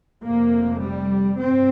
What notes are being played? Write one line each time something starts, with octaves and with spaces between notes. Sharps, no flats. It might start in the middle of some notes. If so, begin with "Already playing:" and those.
F1 F2 C3 A#3
G3
G2 C4